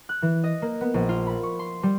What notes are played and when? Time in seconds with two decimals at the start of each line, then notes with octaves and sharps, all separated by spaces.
0.09 F#6
0.22 E3
0.44 D#5
0.62 A#3
0.81 B3
0.94 A#1
1.09 F4
1.26 B5
1.43 C#6
1.59 C6
1.83 G3